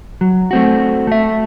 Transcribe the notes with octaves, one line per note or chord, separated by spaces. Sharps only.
F#3
A3 C4 F#4
A3 E5